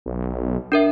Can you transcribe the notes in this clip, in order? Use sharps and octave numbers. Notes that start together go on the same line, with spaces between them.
B1
D4 A#4 E5